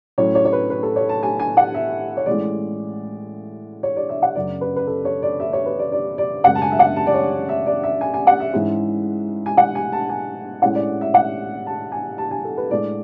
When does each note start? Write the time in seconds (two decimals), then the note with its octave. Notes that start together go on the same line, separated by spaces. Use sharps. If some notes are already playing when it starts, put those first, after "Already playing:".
0.18 A2 F#3 C#4 C#5
0.35 C#5
0.45 C#5
0.53 B4
0.70 B4
0.83 A4
0.96 C#5
1.09 A5
1.23 G#5
1.40 G#5
1.57 F#5
1.75 E5
2.17 C#5
2.26 A1 A2 G#3 D5
3.83 C#5
3.96 D5
4.09 E5
4.22 F#5
4.35 F#2 C#3 F#3 D5
4.61 B4
4.76 B4
4.87 A4
5.05 C#5
5.23 D5
5.40 E5
5.53 C#5
5.66 B4
5.79 D5
5.92 D5
6.18 D5
6.44 F#2 C#3 G#3 F#5
6.55 A5
6.62 G#5
6.72 E5
6.79 F#5
6.96 A5
7.07 D5
7.14 C#5
7.49 E5
7.67 D5
7.83 E5
8.01 G#5
8.14 G#5
8.27 F#5
8.40 E5
8.53 G#2 E3 G#3 C#4 E4
9.46 G#5
9.57 F#5
9.75 G#5
9.93 A5
10.09 G#5
10.62 A2 G#3 C#4 E4 F#5
10.75 D5
11.01 E5
11.14 F#5
11.67 A5
11.92 G#5
12.18 A5
12.31 G#5
12.45 A4
12.58 B4
12.70 A2 G#3 D4 D5